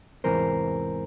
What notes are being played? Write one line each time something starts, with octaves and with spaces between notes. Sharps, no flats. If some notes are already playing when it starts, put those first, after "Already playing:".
E2 G#2 C3 E3 A#4 C5